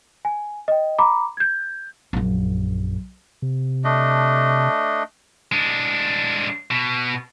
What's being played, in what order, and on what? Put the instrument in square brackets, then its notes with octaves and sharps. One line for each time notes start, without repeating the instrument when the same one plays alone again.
[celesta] G#5
D#5 G5
A#5 B5 D6
G6 G#6
[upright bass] A#1 F#2
[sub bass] C3
[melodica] A3 D4 D#5
[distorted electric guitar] G#3 D4
B2